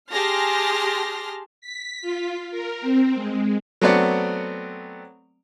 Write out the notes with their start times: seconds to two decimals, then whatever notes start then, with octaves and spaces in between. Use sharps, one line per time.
0.11 G4 G#4 A5 C6 F6 A#6
1.61 B6
2.02 F4
2.51 A#4
2.81 C4
3.15 G#3
3.82 F#3 A3 B3 C4 D5 F#5